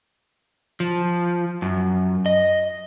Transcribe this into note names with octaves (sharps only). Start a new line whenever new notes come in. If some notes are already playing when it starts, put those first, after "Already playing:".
F3
F#2
D#5